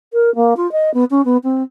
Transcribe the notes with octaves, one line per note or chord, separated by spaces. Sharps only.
A#4
A#3
F4
D#5
B3
C#4
B3
C4